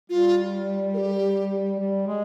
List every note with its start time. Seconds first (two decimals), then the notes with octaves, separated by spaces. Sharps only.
0.10 G3 F4
0.94 A#4
0.98 G4
1.79 G3
2.08 G#3